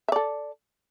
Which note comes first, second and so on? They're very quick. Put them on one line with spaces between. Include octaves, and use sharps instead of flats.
E5 D5 A4